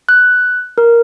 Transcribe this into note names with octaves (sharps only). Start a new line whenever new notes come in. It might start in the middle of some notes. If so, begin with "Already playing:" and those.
F#6
A#4